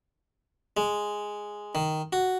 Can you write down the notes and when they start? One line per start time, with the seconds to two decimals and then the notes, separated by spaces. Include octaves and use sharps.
0.77 G#3
1.75 D#3
2.13 F#4